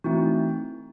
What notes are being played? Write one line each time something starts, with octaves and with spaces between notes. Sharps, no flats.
E3 A3 C4 D#4 F#4